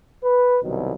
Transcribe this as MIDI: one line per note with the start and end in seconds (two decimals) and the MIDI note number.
0.24 0.58 71
0.63 0.93 36
0.63 0.93 47
0.63 0.93 51
0.63 0.93 54